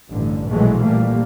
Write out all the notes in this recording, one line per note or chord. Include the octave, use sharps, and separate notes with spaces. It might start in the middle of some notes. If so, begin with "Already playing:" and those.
A1 G2 D3
A#1 B2 E3 F#3 G#3 A3
A#1 A#2 G3 A3 A#3